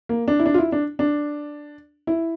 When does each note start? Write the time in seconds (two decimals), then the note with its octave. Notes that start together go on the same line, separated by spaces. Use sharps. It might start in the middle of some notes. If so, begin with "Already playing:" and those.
0.09 A#3
0.28 D4
0.39 E4
0.46 D4
0.54 F4
0.58 E4
0.72 D4
0.99 D4
2.07 E4